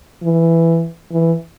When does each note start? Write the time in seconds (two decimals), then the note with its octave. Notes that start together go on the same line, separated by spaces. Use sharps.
0.23 E3
1.12 E3